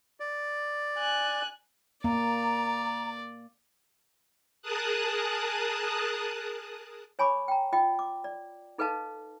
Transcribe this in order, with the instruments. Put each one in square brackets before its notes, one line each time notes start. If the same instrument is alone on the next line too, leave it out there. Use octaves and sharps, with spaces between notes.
[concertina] D5
[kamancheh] G#5 F#6
[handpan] A#3 [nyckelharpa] D5 [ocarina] A#5
[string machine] G#4 A#4 A5 D#6 F#6
[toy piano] C#5 G#5 B5 C#6 D6
G5 A#5
F4 D#5 G5
D6
D5
D#4 A4 B4 D#5 F5 A5